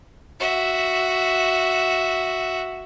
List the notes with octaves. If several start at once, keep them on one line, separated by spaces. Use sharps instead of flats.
F#4 E5